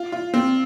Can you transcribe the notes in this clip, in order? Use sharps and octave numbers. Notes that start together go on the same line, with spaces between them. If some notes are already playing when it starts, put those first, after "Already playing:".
Already playing: F4
F4
C4